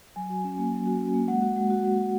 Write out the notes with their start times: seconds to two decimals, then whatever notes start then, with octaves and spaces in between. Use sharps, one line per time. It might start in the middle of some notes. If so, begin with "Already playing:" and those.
0.16 F#3 G#5
0.30 F#4
0.44 C#4
0.58 A#3
0.72 F#3
0.87 F#4
1.01 C#4
1.14 A#3
1.28 G#3 F#5
1.42 F#4
1.56 G#3
1.70 F#4
1.84 G#3
1.98 F#4